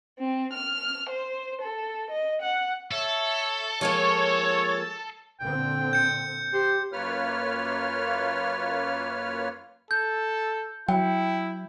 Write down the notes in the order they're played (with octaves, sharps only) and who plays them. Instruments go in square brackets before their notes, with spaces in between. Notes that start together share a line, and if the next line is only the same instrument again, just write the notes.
[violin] C4
F6
C5
A4
D#5
F#5
[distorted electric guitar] A4 [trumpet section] C#5 E5
[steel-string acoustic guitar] F3 G#3 A#3 [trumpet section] C#5
[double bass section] A#2 D3 C4 [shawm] G5
[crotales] G6 C#7
[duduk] G4 [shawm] C5
[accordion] F#2 A#3 F4 B4 C#5 F6
[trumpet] A4 [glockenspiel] G6
[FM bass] F#3 [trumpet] E4 [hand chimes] G5